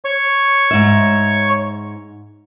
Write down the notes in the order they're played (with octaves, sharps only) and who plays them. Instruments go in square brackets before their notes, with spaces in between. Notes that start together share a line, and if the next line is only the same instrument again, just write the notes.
[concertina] C#5 C#6
[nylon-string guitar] G#2 E5